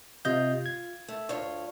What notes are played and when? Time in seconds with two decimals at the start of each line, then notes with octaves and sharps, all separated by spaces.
0.25 C3 F4 D#5 G6
0.66 G#6
1.08 A3
1.29 D2 F4 C#5